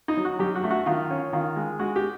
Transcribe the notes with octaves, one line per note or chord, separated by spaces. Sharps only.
D#4
F#3
F#4
F#2 G4
F#4
A3
F#4
D#3 F4
C#4
D#3 F4
G#3
G#3 F#4
G4